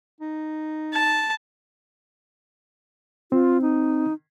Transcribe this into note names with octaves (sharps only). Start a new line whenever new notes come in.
D#4
A5
C4 F4
D#4